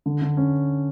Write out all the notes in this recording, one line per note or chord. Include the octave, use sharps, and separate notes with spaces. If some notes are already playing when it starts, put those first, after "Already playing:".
D3
D3
C#4